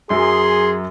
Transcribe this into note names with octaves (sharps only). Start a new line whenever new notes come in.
F#2 F#3 G#4 C6